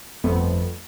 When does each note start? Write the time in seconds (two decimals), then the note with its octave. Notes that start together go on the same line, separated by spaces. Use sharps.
0.24 G1 F2 A3 B3